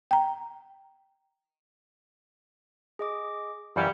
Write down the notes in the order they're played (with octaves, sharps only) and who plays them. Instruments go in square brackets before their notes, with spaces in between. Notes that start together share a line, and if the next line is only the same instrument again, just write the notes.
[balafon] G5 A#5
[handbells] G#4 D#5 D6
[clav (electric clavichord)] F#2 E3 C#4 [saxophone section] G3 [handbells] F5 B5 C#7